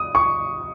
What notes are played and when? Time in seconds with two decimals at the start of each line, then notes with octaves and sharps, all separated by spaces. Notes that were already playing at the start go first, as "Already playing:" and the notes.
Already playing: D#6
0.15 C#6